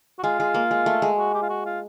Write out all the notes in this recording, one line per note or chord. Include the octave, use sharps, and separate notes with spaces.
F#4
G#3 F4
G#3
A#3
G#3
A3
G#3
F#4
G4
F4
F#4
F4